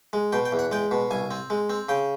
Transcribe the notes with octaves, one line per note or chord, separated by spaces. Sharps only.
G#3
B2 G5
G5
E2
F#5
G#3 G5
B2
C2 G#5
C4
G#3
C4
C#3 G5